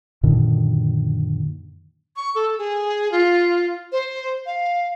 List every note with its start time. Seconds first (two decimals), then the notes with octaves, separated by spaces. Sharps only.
0.23 F#2 A#2 D3 D#3
2.16 C#6
2.35 A4
2.58 G#4
3.12 F4
3.92 C5
4.46 F5